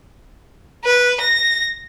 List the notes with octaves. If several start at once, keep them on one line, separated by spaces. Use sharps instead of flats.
B4
A#6